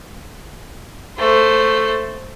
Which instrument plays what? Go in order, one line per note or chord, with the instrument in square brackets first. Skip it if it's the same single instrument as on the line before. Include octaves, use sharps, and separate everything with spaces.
[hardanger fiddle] A3 C5